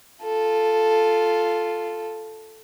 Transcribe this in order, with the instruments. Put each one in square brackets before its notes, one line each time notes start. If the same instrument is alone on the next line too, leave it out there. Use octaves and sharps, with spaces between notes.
[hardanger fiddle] F4 A4